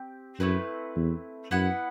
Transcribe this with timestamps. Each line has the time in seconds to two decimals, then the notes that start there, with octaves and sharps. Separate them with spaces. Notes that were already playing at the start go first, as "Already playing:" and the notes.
Already playing: C4 G4
0.39 F#2 A3 C4 E4 B4
0.96 E2
1.51 F#2 B3 E4 B4 F#5